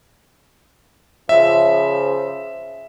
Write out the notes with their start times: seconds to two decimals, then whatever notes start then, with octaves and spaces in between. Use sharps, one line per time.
1.29 C#3 F3 E5